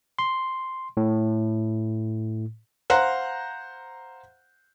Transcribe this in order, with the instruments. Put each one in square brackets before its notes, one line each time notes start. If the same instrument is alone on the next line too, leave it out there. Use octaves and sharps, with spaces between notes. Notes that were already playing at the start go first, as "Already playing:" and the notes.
[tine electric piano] C6
A2
[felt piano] C5 F5 F#5 A#5 F#6